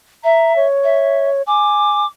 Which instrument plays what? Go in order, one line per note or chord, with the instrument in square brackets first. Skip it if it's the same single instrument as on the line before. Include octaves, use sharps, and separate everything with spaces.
[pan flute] E5 [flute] A#5
[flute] C#5
[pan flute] E5
[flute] G#5 [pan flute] D6